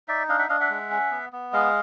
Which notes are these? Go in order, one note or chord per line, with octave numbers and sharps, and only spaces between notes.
D#4 D5 E5
D4 D#5 F5
E5 F#5
D4 D#5 F5
E5 F#5
G#3
C#4
B3
B3
G#3 D#5 F5